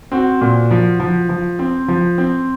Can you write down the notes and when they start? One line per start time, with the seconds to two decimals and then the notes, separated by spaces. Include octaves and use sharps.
0.12 C4 F#4
0.41 A#2
0.71 F3
1.00 F3
1.29 F3
1.59 C4
1.88 F3
2.18 C4